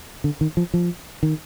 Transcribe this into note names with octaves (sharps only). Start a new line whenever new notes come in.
D3
D#3
F3
F3
D#3